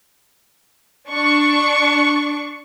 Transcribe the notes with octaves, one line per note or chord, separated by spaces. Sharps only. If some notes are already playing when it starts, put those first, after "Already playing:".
D4 C#6